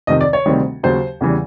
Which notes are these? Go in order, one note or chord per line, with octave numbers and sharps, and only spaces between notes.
F2 C3 D#3 D#5
D5
C#5
D2 C3 D#3 G3 C4
D#2 C#3 F#3 C5
E2 C#3 E3 G3